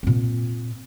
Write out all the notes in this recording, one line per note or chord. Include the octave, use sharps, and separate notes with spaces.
A#2 C4